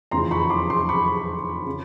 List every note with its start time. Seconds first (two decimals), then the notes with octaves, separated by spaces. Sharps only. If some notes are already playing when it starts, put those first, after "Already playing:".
0.11 F1 E2 C#3 F3 A#5 C6
0.31 B5 C#6
0.50 C6 D6
0.70 C6 D6
0.89 B5 C#6
1.66 C#3